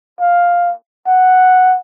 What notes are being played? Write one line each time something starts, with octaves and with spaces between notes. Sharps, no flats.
F5
F#5